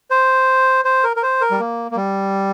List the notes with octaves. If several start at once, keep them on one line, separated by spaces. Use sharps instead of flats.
C5
C5
A#4
A#4
C5
A#4
G3
A#3
A#3
G3